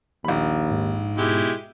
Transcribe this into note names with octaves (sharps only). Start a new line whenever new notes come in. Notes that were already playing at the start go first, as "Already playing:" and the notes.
A#1 D#2 B5
G#2
B2 G#3 E4 G4